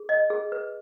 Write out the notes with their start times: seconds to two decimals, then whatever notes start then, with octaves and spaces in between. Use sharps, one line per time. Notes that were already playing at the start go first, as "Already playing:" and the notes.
Already playing: G#4
0.09 D#5
0.30 G#4
0.52 B4